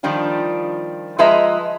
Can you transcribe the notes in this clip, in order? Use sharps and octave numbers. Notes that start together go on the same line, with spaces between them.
D#3 F3 G3 D4 F4
F3 G#3 B4 D#5 E5 A#5